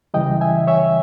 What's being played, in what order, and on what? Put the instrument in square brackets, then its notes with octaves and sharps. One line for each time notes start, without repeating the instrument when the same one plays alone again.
[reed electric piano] C#2 C#3 E3 G3 D#5 G5
E5 G#5
C#5 E5